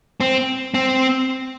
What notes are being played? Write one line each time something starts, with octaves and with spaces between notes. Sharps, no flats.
C4
C4